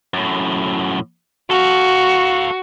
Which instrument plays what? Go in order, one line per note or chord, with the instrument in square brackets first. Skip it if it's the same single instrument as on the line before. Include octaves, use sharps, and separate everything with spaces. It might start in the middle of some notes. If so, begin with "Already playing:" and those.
[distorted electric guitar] F#2 A2
[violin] F#4 [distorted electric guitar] A4 F5